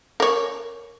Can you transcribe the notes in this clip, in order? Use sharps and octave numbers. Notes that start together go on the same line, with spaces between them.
A#4 C#5